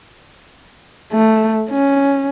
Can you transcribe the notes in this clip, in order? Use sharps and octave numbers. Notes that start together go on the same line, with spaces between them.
A3
C#4